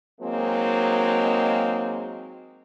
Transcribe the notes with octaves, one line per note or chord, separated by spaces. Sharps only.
F#3 G#3 A#3 C4 D#4